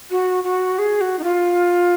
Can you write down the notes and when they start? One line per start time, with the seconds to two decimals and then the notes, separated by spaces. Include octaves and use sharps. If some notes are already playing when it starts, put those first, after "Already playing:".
0.11 F#4
0.44 F#4
0.79 G#4
1.01 F#4
1.19 D#4
1.24 F4